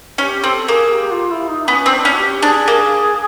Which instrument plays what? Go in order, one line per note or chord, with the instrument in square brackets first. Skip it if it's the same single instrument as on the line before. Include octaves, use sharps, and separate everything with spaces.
[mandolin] C#4 [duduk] G4
[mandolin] C4 [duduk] A4
[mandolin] A#3 [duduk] G#4
[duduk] G#4
G4
F4
E4
D#4
[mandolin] B3 [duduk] C#4
[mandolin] C4
[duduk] D4
[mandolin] C#4
[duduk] F#4
G4
[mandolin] D4 [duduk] G#4
[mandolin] A#3